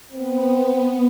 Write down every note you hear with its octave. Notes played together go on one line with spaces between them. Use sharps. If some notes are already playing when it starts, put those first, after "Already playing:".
B3 C4